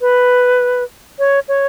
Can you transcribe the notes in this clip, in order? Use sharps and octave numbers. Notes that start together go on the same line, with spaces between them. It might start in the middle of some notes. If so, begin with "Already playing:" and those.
B4
C#5
C#5